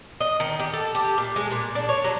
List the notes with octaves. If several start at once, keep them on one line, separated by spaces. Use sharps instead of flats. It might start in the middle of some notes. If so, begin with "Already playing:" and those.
D#5
D#3
G4
A4
G4
A#2
G#3
A#2
D4
C#5
F#3